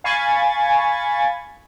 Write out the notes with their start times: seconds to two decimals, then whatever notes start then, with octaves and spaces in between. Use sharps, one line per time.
0.04 F5 G#5 B5 C#6 G#6 A6